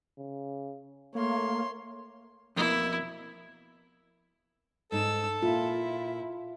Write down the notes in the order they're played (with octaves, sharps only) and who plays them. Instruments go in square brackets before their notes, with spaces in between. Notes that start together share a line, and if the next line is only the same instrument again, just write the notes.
[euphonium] C#3
[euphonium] A3 [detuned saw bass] A#3 [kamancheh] C#5 C6
[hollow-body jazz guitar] F2 B2 A#3 [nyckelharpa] E4
[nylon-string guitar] G#2 D#4 [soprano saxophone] A4 [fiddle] E6
[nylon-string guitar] A#2 [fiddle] E4 [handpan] F4